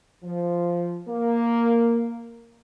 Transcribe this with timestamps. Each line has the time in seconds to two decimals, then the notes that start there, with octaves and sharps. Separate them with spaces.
0.24 F3
1.09 A#3